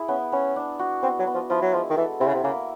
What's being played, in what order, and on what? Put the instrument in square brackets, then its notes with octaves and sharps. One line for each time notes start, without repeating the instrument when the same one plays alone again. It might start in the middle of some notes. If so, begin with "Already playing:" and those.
Already playing: [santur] E4 G#4
[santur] B3 [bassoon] C#4
[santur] B3 [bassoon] C#4
[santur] D4
F#4
[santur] B3 [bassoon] C4
[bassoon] F#3
[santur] B3
[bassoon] F3
[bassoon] F3 [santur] E4
[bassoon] F#3
[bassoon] F3 [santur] G#3
[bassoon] D#3
[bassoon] E3 [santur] A4
[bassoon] C3 [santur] E4
[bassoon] C#3
C3
[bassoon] C#3 [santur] A#3